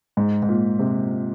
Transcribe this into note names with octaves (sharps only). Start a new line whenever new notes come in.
G#2
G#2
A#2
C3